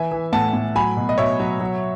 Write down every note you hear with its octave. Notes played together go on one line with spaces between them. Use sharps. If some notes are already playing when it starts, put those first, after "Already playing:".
Already playing: E3 E5 G#5
E3
A2 F#5 A5
A2
F#3 G#5 B5
B2
D#5
B2 C#5 E5
F#3
F#3